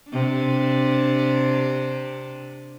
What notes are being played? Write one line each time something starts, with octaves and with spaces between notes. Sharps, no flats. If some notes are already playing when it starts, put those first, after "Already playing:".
C3 D4